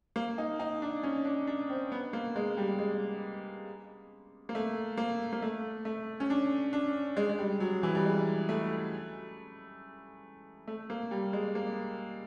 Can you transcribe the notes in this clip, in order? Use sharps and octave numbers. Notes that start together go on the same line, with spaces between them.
A#3
D#4
D#4
D4
C#4
D4
D4
C4
B3
A#3
G#3
G3
G#3
A#3
A3
A#3
A#3
A3
A3
C#4
D4
D4
G#3
G#3
G3
F#3
E3
G3
G#3
A3
A3
A#3
G3
G#3
A#3